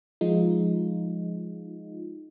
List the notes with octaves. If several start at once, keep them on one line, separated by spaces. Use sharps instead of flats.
F3 G#3 D#4 F4